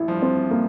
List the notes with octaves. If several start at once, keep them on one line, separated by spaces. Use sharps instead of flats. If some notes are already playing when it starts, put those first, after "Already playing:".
Already playing: A1 E4
G2 F3
C4
A#3